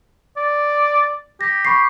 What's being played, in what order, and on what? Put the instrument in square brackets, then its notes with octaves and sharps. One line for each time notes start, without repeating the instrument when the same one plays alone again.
[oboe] D5
[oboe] G4 [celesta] A#6
[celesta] B5 C#6 C7